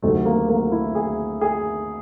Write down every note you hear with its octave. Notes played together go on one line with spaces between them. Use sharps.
D2 C3 D#3 F#3 A3
A#3
A#3
E4
G#4
G#4